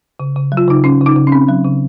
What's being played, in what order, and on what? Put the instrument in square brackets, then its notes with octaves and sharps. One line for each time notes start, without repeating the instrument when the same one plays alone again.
[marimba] C#3
C#3
F#3
F4
C#3 D#4
C#3 C#4
C#3
D#4
C#3
C#4
C4
F#3
C#3